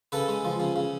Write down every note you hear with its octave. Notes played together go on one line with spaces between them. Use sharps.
C#3 A4 B4
G#3
F3
C#3
C#3